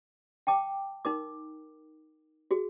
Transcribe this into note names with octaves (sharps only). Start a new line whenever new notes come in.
G5 A5 D6
D#4 A#4 D6
F#4 G#4